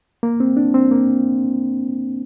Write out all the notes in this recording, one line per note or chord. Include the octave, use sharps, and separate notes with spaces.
A#3
C4
D4
C4
A#3